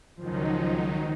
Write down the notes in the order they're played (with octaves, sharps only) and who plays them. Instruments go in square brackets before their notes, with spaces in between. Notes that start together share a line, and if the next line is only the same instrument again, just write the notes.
[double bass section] C#2 F3 [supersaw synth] D#3 F#3 D#4